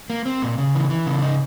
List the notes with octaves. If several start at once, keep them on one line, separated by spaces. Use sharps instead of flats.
A#3
C4
A#2
C#3
E3
E3
C#3
D#4